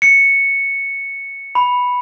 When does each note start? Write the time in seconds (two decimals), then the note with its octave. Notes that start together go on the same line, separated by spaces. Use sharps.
0.02 C#7
1.55 B5